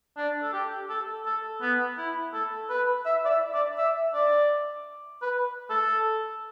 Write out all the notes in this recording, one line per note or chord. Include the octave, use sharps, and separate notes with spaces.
D4
A4
G4
A4
A4
B3
E4
A4
B4
E5
D5
E5
D5
E5
D5
B4
A4